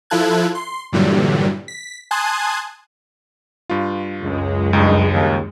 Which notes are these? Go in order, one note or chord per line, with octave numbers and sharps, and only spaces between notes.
F3 E4 F4 A4 F#6 G#6
C6
G2 A#2 D3 E3 F#3 G3
B6
G#5 A5 C6 D#6 F#6 G#6
G2 F4
C#2 F#2 G#3
C#2 G2 D#4
D#2